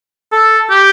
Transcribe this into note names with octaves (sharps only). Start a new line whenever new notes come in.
A4
G4